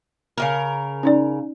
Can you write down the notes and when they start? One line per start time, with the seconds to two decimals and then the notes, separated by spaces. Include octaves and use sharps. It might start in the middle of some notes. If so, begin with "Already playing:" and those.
0.38 C#3 E3 A#4
1.03 C#4 D#4 D5